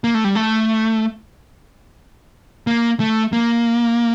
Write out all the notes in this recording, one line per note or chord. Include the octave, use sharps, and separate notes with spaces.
A#3
A3
G3
A3
A#3
A3
A#3